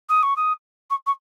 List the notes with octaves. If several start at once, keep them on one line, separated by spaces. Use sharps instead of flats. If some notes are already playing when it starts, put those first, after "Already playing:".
D#6
C#6
D#6
C#6
C#6